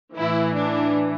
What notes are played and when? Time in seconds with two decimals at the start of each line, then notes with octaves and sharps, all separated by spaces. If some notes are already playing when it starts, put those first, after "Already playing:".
0.16 A2 E3 E4
0.54 D4